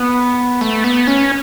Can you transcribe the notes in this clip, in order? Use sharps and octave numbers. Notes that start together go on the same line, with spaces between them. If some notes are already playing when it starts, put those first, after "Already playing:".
Already playing: B3
A3
B3
C#4